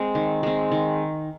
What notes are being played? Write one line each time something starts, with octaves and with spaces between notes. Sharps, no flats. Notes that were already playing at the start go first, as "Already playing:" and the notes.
Already playing: G#3 C4
D#3
G#3 C4
D#3